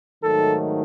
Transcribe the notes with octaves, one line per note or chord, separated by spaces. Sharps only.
G#2 D#3 F#3 A3 A4